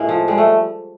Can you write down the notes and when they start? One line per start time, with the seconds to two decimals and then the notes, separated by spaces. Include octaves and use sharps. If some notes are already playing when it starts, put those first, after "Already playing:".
Already playing: A2 G#3 A#3 C4
0.09 F3
0.28 G3 G#3
0.38 A3